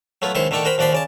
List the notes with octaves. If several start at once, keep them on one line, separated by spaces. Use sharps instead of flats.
F#3 A3 B3 F4
C#2 D#3 E4 C5 C6 C#6
D3 D#3 A3 D5 G5 C#6
F#4 A#4 C5 G5 B5
D#2 F3 F#4 D5 B5 C6
C#3 D5 A5